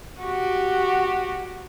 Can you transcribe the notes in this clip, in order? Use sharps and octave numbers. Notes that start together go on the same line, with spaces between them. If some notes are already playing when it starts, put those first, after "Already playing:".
F#4 G4